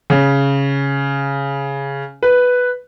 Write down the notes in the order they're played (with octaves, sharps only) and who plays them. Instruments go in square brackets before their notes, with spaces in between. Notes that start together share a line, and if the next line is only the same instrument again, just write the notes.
[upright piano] C#3
[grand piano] B4